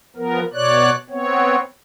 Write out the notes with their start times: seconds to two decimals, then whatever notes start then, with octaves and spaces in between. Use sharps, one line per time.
0.16 F3 B3 A#4
0.54 B2 C#5 D5 F#6
1.10 B3 C4 C#5